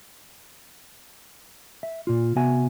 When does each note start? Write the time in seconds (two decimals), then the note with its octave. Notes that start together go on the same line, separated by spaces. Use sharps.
1.83 E5
2.07 A#2 F4
2.36 C3 B3 F#4 E5 G#5